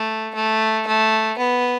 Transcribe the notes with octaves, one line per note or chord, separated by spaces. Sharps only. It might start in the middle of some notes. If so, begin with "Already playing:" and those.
Already playing: A3
A3
A3
B3